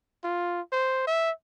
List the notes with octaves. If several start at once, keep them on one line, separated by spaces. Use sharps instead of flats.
F4
C5
E5